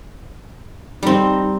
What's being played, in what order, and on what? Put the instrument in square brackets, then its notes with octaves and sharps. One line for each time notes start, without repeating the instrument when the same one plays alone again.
[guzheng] G3 C4 [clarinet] D#4